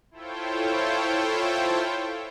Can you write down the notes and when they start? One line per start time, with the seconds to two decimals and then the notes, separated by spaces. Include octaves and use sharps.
0.11 E4 F4 A4 C5 C#5 G5